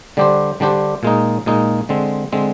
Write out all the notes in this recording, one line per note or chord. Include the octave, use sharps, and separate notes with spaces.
D3 G3 D4 G4 C5
D3 G3 D4 G4 C5
A#2 G#3 D#4
A#2 G#3 D#4
D3 G#3 C4
D3 G#3 C4